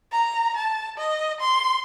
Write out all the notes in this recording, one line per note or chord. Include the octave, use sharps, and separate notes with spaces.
A#5
A5
D#5
C6